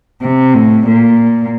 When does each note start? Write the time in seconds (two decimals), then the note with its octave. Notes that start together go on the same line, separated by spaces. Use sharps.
0.21 C3
0.54 A2
0.87 A#2